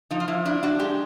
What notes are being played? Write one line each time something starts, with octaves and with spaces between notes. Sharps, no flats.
F3 D#4
F4
F3 E4
D4 E4
D4 F#4
G#3 G4